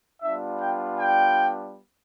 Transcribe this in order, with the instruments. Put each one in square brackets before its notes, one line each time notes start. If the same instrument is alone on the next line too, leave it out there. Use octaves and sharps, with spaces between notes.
[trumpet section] G3 B3 D4 F4 E5
G5
G5